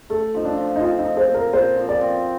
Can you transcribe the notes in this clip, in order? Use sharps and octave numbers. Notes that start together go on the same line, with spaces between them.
A3 A4
F3 D#4
D4
F3
D#4
C4 F4
D#4
C4
C5
A#2
A#4
A#2 C5
F3
D5
C4